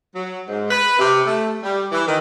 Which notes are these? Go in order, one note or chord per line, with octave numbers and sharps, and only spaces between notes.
F#3
G#2
B4
C3
A3
G3
E3
D#3